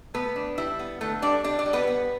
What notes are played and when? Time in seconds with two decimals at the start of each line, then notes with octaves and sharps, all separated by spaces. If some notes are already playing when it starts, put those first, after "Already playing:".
0.14 A3 B3 B4
0.36 D4
0.58 G3 E4
0.79 B3
1.01 D3 A3 A4
1.22 G3 D4 D5
1.44 G3 D4 D5
1.59 D4 D5
1.66 G3
1.73 B3 B4
1.87 B3